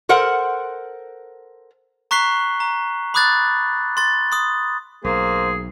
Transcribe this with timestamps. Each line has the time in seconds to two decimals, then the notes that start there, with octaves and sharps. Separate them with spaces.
0.09 A4 A#4 C5 F#5
2.11 A#5 C#6 F#6 B6 C7 G7
2.60 A#5
3.14 B5 D6 D#6 F#6 G#6 A6
3.97 C6 A6
4.32 C6 D#6
5.04 B1 A#3 G#4 C5